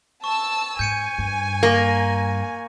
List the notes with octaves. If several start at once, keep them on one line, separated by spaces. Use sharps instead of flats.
A5 C#6 E6
G#2 G#5 G6 C#7 D#7
G2
A#3 A#5 C#6 A#6